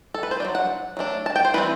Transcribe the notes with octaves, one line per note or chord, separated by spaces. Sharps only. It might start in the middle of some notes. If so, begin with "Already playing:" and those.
A4
B4
C5
F#3 A3 D4 D5
F#5
F#3 A3 D4
A5
G5
C5
E3 G3 C4 B4